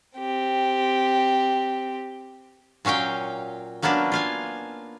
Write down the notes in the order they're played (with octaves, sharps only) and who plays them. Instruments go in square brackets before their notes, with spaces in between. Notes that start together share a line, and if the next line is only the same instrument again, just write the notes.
[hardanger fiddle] C4 G4
[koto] A#2 F#3 C#4 F5 G5
F#3 A#3 B3 C#4 D4
F4 F5 G#5